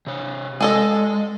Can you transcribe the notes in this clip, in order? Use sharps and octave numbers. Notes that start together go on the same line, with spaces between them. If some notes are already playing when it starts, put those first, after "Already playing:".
C3 C#5
G#3 G#4 A4 D#5